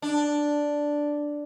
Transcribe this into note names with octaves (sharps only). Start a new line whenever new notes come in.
D4